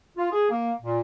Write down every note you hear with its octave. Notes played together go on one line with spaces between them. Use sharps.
F4
G#4
A#3
A#2